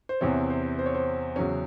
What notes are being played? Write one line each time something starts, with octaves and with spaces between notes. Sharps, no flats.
C5
E2 C3 E3 C4 C#5
C5
C5
C#5
C5
E2 C#3 F#3 C#4